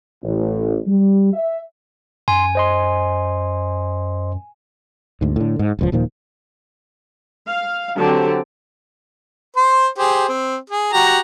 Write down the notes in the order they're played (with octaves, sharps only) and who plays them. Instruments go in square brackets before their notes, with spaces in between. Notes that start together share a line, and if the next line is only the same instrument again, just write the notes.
[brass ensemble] A1
G3
E5
[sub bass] F#2 [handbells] G#5 [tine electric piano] C6
[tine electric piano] C5 D#5 C6
[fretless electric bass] D2 G#2
A2 D3
G#2
D#1 C#2 F3
D#1 A#2 D#3 F3
[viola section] F5
D3 F#3 C4 G4 A5
[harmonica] C5 C6
G4 G#4 C5
C4
G#4
F#4 G4 A#5